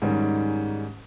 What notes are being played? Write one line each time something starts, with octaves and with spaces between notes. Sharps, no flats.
G#2 D#3 G3 C#4